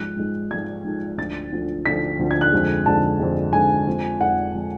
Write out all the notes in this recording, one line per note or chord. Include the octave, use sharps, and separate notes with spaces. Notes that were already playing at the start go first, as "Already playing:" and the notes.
Already playing: G#2 F3 G#3 F#6
G#2 F3 G#3
G#2 F3 G#3 G#6
G#2 F3 G#3
D2 D3 F3 A6
D2 D3 F3
D2 D3 F3 B6
D2 D3 F3
G#6
F#6
F2 D3 G#3
F2 D3 G#3 A5
F2 D3 G#3
F2 D3 G#3 G#5
F2 F3 G#3
F2 F3 G#3 F#5
F3 G#3